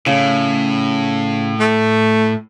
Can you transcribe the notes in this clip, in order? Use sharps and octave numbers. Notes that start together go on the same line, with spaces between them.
A2 C#3
A3